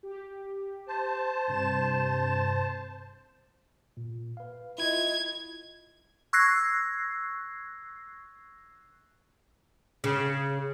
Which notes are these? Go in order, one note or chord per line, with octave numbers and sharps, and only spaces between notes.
G4
C5 A5
G2 C3 E7
A#2
B4 F5
E4 F4 D#5 G#6
C#6 E6 F#6 G#6 A#6 C7
C#3